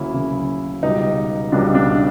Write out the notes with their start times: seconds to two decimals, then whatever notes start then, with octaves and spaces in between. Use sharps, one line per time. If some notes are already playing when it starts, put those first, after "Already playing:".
Already playing: D2 C#3 F#3 A#3 E4
0.13 D2 C#3 F#3 A#3
0.83 C#2 B2 G3 D#4
1.52 C#2 B2 G3 D4
1.75 D4